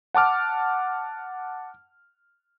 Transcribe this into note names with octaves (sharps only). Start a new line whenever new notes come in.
F#5 A5 D6 F6